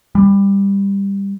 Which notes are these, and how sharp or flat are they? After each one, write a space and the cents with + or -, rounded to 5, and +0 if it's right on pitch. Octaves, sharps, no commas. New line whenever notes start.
G3 +15